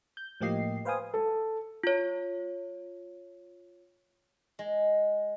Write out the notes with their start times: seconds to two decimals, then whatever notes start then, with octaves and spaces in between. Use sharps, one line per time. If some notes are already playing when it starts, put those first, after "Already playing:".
0.17 G6
0.41 A2 F3 A#3 G4 D#5 C7
0.85 B4 C5 F5 G5 G#5 D#6
1.14 A4
1.84 F4 C#5
4.59 G#3